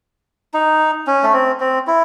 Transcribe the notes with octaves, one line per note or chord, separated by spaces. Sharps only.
D#4
C#4
A3
C4
C4
E4